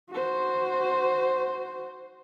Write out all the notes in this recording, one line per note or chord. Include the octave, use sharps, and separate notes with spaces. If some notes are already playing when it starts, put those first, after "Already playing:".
F#4 C5